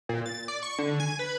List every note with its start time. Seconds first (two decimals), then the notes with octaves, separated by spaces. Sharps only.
0.09 A#2
0.26 A6
0.48 D5
0.63 C#6
0.79 D3
1.00 G#5
1.19 B4